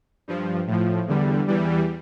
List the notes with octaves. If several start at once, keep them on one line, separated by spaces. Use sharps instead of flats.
G2 F3
A2 F3
E2 D3 G3
E2 E3 G3